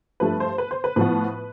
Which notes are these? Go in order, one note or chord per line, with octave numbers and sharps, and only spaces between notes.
G2 F3 A3 B4
C5
B4
C5
B4
A2 F3 B3 B4